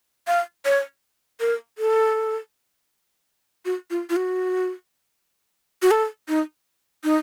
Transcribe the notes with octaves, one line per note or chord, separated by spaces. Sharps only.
F5
C#5
A#4
A4
F#4
F4
F4
F#4
F#4
A4
D#4
D#4